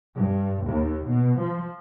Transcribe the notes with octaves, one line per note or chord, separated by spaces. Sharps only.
G2
D#2
B2
F3